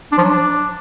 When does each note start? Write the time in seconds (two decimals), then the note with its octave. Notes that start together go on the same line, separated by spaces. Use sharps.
0.12 D4
0.18 F3
0.23 F#3
0.29 D4